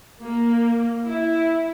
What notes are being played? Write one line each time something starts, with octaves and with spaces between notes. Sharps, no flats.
A#3
E4